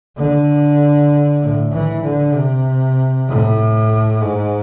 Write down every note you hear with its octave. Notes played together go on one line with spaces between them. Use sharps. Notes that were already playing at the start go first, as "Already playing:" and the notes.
D3
A2
E3
D3
C3
A2
G#2